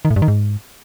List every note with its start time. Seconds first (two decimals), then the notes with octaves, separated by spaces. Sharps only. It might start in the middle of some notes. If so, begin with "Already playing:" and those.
0.05 D#3
0.11 A2
0.16 G2
0.22 D#3
0.28 G#2